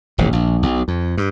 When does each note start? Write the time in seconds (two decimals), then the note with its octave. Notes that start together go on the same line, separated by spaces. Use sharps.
0.18 D#1 A1 G#2
0.33 A#1
0.62 B1
0.88 F2
1.17 G2